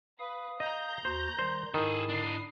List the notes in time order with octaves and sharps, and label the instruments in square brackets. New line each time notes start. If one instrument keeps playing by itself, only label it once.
[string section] B4 [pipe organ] F5 D#6
[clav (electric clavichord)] D#5 [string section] A#5 G6
[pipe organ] D#2 F#4 [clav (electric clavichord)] C5
[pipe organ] D#3 G3 C6 [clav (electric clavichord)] C5
[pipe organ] G#2 E4 D#6 [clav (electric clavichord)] D#3 [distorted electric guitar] G#4 A4
[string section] D3 C7 [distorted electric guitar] D4 D#4